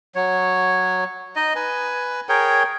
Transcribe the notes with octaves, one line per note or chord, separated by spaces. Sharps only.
F#3 C#5
D#4 D#5
B4 G#5
G#4 A#4 C#5 G5